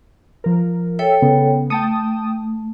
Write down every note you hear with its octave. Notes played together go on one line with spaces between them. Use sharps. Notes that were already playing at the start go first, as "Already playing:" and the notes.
F3 A#4
A4 C#5 E5 G5
C#3 B3
A3 G5 A5 D#6